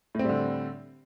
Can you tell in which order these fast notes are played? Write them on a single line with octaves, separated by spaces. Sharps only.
A2 C4 G3 D3